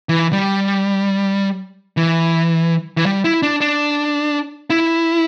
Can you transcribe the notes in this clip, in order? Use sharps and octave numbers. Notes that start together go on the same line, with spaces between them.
E3
G3
E3
E3
G3
E4
D4
D4
E4